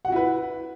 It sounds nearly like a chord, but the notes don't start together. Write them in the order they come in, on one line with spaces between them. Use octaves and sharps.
F#5 F#4 E4 B4